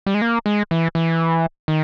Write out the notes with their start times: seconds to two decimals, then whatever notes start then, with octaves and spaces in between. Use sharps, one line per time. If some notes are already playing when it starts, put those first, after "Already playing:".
0.06 G3
0.14 G#3
0.22 A#3
0.46 G#3
0.71 E3
0.95 E3
1.68 D#3